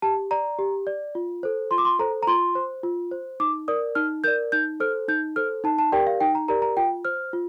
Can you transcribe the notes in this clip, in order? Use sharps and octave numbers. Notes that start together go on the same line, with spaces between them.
G4 A5
D5 A#5
G4
D5
F4
A4 C5
F4 C6
D6
C6
A4 C5 A#5
A#5
F4 C6
C5
F4
C5
D#4 D6
A#4 D5 D#6
D#4 F6
A#4 D5 G6
D#4 G6
A4 C5 F6
D#4 G6
A4 C5 F6
D#4 A5
A5
G4 A#4 D5 G5
F5
D#4 G5
A#5
G4 A#4 D5 A#5
A#5
F4 G5
C5 F6
F4